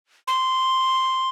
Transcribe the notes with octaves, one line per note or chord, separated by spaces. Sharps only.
C6